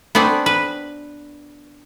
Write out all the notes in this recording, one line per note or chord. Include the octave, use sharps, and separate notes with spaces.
B3 C4 D4 F#4
B4